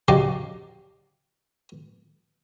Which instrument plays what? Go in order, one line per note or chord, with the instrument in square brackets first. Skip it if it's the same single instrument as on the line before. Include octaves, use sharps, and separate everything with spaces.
[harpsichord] C#3 F#3 G4 D5 D#5 C6